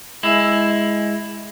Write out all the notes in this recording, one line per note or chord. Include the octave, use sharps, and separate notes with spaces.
G#3 E4